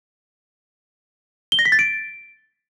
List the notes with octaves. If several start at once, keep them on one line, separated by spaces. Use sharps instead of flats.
G7
A#6
B6
A6
D7